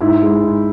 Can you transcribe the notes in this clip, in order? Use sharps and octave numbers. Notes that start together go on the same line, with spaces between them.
G#2 E4
G#3
G#2